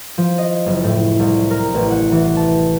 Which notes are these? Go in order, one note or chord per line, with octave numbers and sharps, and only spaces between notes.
F3
D#5
F#1
A2
C2
A#4
A1
F#5
E3
A5